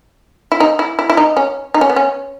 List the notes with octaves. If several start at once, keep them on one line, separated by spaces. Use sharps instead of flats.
E4
D#4
E4
E4
E4
D#4
C#4
D#4
C#4
B3
C#4